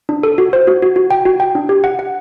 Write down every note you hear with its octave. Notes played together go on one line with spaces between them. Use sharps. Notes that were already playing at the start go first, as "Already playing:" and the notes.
D4
A4
F#4
C5
F#4
F#4
F#4
G5
F#4
G5
D4
G4
F#5
F#5